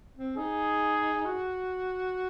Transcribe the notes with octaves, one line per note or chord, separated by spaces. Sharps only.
C4
D#4 G#4
F#4